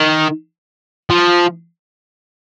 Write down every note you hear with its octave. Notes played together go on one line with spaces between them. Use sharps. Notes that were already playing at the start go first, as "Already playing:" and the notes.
Already playing: D#3
F3